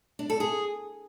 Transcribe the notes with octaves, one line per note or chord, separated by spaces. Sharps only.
D4
A4
G#4